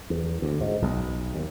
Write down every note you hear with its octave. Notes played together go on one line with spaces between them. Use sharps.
E2
D2
G#2
B1
D#2